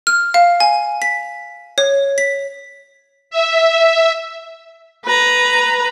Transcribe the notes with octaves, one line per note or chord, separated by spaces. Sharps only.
F6
F5
G#5
B6
C#5
B6
E5
B4 A#5